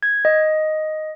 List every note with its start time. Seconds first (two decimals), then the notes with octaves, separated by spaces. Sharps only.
0.03 G#6
0.25 D#5